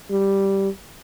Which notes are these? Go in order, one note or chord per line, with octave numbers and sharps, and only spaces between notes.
G3